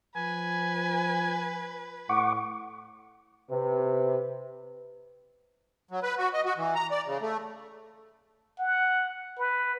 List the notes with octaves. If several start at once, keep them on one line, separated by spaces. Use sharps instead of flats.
F3 B4 G#5
A2 F#5 C#6 D6
C3 B4
F#3
B4
F#4
D#5
F#4
E3
A#5
D5
C#3
A3
F#5
B4